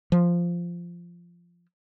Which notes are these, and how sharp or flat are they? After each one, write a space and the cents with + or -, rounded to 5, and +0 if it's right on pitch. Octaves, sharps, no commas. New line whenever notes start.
F3 -10